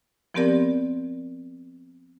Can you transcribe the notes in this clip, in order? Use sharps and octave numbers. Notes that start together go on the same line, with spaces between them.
F3 B3 C4 G4 A#4 D5